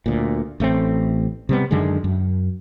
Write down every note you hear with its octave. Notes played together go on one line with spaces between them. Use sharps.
D2 A#2
A1 A3 A#3 C4
C3 G3 B3
F#2 D3 D#3 G#3
F#2